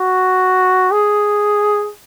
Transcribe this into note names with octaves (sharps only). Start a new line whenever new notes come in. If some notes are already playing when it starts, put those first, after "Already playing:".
Already playing: F#4
G#4